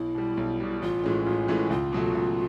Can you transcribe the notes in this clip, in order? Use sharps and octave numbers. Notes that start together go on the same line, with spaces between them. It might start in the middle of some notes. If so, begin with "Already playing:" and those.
Already playing: B1 E4
B2 G3
B1
B2 G3
A1 F4
A2 E3 G#3 C#4
A1
A2 E3 G#3 C#4
C#2 F4
B2 F#3 A3
C#2